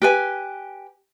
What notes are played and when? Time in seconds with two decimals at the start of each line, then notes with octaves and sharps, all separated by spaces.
0.02 G4 B4 G#5